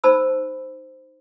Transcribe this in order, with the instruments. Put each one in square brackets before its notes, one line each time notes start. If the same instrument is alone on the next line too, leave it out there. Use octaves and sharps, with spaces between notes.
[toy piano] D#4 C5 A5 B5 E6